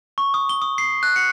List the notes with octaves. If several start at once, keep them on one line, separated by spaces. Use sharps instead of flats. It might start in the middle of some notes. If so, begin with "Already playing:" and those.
C#6
D#6
G7
D#6
C7
F#6
C#7